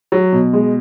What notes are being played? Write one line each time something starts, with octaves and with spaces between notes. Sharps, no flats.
F#3
B2
G#3